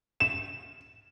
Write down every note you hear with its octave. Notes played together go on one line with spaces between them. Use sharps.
E7